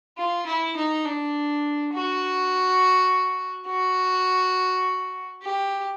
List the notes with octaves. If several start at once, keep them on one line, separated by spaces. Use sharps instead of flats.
F4
E4
D#4
D4
F#4
F#4
G4